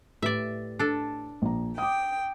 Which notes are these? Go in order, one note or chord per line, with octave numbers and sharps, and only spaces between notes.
A2 G4 B4 D5 E5
D4 A4
A#1 A#5
G5 D6 D#6